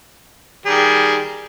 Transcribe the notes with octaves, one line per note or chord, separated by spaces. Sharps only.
D#3 G3 G#4